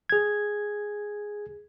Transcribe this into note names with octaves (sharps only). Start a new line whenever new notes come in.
G#4 G#6